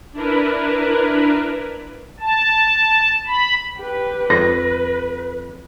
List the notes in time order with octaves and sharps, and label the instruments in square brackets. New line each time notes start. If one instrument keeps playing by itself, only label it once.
[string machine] D4 E4 A#4 B4
[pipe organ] A5
B5
[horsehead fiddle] G4 B4
[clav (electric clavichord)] F2 [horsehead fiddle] B4 [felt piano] A#6